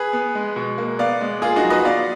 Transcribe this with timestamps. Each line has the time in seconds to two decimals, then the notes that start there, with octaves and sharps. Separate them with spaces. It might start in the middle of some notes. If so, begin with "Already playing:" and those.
Already playing: G#4 B4
0.13 B3
0.35 G#3
0.56 B2
0.78 A#3
0.99 B3 D5 F5
1.21 G#3
1.42 A#3 F4 G#4
1.56 D#4 F#4
1.64 F#3
1.70 B4 D#5
1.85 B3 D5 F5